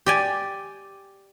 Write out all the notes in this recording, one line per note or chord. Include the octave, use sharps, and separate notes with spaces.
G4 D5 G#5